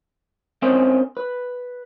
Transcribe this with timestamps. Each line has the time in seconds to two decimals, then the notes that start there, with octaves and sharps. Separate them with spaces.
0.62 C4 C#4 A#4 C5 D#5
1.17 B4